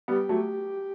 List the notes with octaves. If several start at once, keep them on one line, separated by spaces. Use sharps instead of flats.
G3 B3 G4
F#3 A3